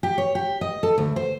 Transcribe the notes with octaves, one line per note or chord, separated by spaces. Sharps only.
G4
C#5
G4
D#5
A4
D2
C5